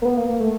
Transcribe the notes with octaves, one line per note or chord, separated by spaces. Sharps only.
A#3
B3
A#3
A#3
A3